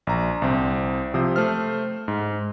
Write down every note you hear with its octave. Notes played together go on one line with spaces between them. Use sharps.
A#1 A#5
C2 C4
C3 F3 C5 D#6
A3 C5 F6
G#2